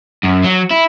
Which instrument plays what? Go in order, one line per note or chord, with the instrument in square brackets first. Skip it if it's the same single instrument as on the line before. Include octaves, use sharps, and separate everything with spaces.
[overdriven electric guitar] F#2
F#3
E4